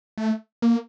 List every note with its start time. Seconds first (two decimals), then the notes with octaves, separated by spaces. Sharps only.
0.18 A3
0.62 A#3